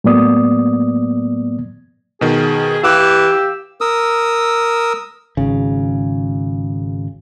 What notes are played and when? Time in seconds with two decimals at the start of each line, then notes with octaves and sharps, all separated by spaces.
0.04 A2 F#3 A#3 B3 D5 D#6
2.21 B2 D#3 G#4
2.84 E3 G4 F5 D6 E6 F#6
3.81 A#4 D#6 E6
5.37 G#1 C#3